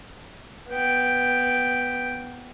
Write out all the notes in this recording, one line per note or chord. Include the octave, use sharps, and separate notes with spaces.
B3 G5